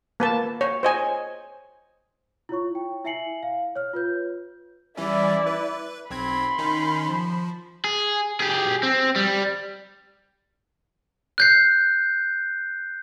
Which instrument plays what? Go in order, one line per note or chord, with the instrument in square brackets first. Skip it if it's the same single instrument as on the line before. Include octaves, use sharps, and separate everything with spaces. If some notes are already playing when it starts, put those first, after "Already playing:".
[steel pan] A#3 B4 A5
C#5
C5 D#5 G#5
[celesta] E4 F4 C#5 C#6
G5
E4 E5 G#5 C7 C#7 F#7
F5
C#5 F6
F4 B4 G6
[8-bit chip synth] E3 G3 C#4 [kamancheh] E4 D5
[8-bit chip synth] B4
[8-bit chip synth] B1 C4 G#6 [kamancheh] B5 C6
[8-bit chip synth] D#3 C#4 D#4
F3
[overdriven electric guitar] G#4
G4 G#4
C4
G3
[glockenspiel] F#6 G6 C7